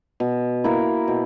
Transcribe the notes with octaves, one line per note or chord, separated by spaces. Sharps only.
B2
A#3 E4 A#4
B2